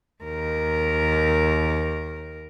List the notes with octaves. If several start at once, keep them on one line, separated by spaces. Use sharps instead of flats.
D#2 A#4